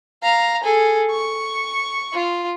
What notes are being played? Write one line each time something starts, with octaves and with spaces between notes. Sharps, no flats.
F5 A#5
G#4 A4
C#6
F4